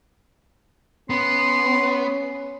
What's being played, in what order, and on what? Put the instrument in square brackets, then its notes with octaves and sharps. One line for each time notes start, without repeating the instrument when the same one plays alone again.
[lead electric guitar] B3 [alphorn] C#4 [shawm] C6